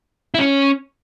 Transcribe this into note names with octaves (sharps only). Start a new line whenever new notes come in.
E4
C#4